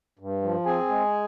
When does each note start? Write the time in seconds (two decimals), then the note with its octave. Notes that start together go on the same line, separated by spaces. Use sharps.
0.19 G2
0.42 F3
0.66 C4 G#4 G#5
0.89 G#3